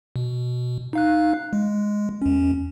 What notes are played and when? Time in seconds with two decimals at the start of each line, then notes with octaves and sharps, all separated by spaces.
0.16 B2
0.93 D#4 F5 F#6
1.53 G#3
2.22 E2 C#4